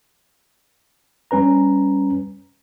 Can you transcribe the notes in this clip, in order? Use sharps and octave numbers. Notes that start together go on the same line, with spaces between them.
G3 C#4 B4 A#5